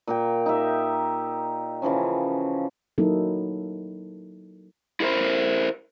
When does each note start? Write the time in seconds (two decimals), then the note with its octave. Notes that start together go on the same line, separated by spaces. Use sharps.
0.07 A#2 A#4 G5
0.46 D#4 G4 E5
1.82 C#3 E3 F3 C#4
2.98 F#3 A#3 D#4 E4 A4
5.00 E4 F#4 A4 A#4 C5